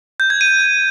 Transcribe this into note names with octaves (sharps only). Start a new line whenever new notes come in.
G6
G#6
D#7